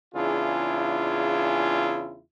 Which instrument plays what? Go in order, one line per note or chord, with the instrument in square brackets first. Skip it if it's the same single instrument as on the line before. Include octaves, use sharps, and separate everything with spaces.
[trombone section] E2 C#3 D4 E4 F4 G#4